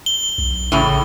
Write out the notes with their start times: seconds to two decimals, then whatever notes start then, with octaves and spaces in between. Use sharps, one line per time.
0.06 G7
0.38 B1
0.72 A1 A2 C#3